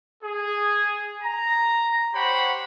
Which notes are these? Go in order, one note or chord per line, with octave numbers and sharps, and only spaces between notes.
G#4
A#5
G4 C5 C#5 F#5 B5